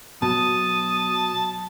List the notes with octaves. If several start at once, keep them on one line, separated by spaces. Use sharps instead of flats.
B2 F#3 A5 D#6